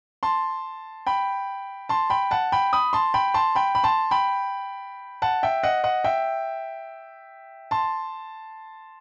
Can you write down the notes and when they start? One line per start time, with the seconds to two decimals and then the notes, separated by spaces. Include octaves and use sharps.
0.23 A5 C6
1.07 G5 B5
1.89 A5 C6
2.10 G5 B5
2.31 F#5 A5
2.52 G5 B5
2.73 B5 D#6
2.93 A5 C6
3.14 G5 B5
3.34 A5 C6
3.55 G5 B5
3.75 B5
3.84 A5 C6
4.11 G5 B5
5.22 F#5 A5
5.43 E5 G5
5.63 D#5 F#5
5.84 D#5 F#5
6.04 E5 G5
7.71 A5 C6